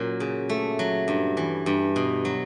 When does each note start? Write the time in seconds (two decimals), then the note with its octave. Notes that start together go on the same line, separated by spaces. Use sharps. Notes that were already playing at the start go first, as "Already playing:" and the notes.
Already playing: A#2 F#3 C#4
0.20 C#3
0.49 A3
0.79 F#3
1.08 G2
1.37 E3
1.66 G2
1.96 B2
2.25 F#3